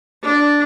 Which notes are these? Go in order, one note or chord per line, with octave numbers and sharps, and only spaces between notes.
D4